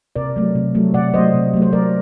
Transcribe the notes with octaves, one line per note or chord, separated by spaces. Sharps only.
C3 A#4 D5
F#3 A3
C3
F#3 A3
C3 D5 F#5
F#3 A3 C5 D#5
C3
F#3 A3
C5
F#3 A#4 D5